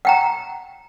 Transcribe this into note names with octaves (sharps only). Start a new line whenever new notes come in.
F#5 G5 A#5